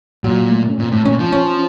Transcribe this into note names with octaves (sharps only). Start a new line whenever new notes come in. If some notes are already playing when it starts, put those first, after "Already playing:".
A#2 F#3
A3
C#4
A#2 C4
A2
A#2 C#4
F3
C#4